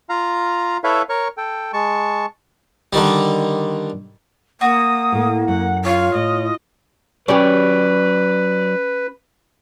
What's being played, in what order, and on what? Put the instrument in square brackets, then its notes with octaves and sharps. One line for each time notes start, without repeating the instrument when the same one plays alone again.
[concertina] F4 F5 A#5
E4 A4 B4 C#5 E5 F5
A#4 C#5 C#6
A4 G5
G#3 A5 C#6
[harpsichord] D3 D#3 G3
[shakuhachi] A#3 [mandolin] F#4 [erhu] D#6
[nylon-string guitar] A2 A3
[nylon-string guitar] F#2 [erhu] F#5
[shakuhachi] F4 [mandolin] C#5 [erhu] F5
[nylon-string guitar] A2 [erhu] D#5
[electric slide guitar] F#3 D5 [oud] C#4 G4 [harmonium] B4